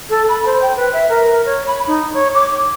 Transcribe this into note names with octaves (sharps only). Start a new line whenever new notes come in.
A4
B5
C5
G5
B4
E5
A#4
C#5
B5
D#4
C#5
D6